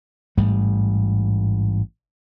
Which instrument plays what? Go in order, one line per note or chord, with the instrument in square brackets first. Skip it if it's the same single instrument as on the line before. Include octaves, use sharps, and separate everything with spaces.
[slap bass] A1 G#2 G3 A3